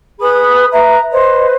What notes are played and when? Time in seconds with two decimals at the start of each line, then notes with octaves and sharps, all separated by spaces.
0.20 G#4 B4 B5 D#6
0.71 B4 E5 A#5
1.11 B4 C5 D#5